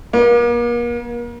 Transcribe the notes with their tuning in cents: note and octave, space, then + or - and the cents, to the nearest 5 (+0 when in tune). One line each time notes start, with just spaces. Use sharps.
A#3 +40